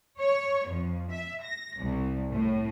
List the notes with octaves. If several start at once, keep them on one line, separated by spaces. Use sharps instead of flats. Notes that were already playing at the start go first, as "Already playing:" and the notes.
C#5
F2
E5
A#6
C2
A2